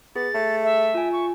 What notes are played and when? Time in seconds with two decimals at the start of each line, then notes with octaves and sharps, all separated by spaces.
0.16 B3 G#4 A6
0.35 A3
0.64 E5
0.95 F4 G#5
1.12 C#6